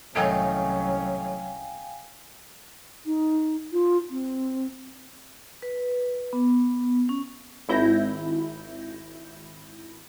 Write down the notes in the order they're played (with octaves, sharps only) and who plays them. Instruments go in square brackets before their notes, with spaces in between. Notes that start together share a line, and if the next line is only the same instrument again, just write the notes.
[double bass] C2 C#4 [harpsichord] A2 D#3 [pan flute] F#3 [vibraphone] F5 G5 G#5
[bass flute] D#4
F4
C4
[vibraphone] B4
B3
C#4
[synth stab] G#1 E4 G6 A#6